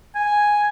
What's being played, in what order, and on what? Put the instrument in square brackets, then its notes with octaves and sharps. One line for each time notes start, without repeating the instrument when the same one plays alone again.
[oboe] G#5